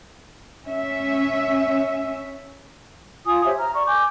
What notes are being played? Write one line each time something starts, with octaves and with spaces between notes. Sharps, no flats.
C#4 E5
F4 G#5 D#6
G4 C5 C#5 E5
A#5 F6
D5 C#6
G#5 D6 G6